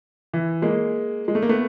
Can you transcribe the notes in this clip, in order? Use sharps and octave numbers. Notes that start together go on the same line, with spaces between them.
E3
G#3 A#3
G#3
A3
A#3
A3 B3